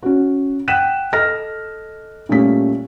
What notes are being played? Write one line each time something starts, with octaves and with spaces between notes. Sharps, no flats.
C#4 F#4
F#5 G5 F#6 B6 D#7 E7
A4 D#5 F6 A#6
A#2 G3 A3 C#4 B6